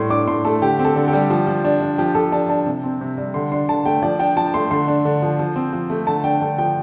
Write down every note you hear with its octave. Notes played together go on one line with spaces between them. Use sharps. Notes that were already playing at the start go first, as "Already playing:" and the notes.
Already playing: A2 G3 C6
D4 D6
A2 C6
A3 A4
D3 G4
C4
A4
D3
G4
G3
F3
F3
D4
D4
F3 G4
F3 A4
D4 A5
D4 A5
C3
C4
C3
G3
D3 C6
D4 C6
D3 A5
A3 G5
F3 D5
D4 G5
F3 A5
A3 C6
D3 C6
D4
D3
F3
F3
C4
F3
A3
D3 A5
D4 G5
D3 G5
F3 G5